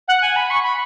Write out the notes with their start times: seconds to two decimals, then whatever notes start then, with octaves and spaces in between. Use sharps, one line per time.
0.08 F#5
0.22 G#5
0.36 B5
0.50 C#6
0.62 B5